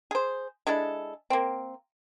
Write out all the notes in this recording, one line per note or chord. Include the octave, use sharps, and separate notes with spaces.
G#4 C5
G#3 D4 E4 A4
A#3 C4